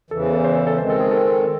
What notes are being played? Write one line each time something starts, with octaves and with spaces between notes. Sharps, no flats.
E2 C#3 E3 A4
C5
A4
C5
A4
A4
D#3 G#3 C4 C5
A4
G#4
A4